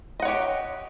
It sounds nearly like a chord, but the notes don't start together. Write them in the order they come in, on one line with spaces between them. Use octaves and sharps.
D#5 F#5 C#5 G4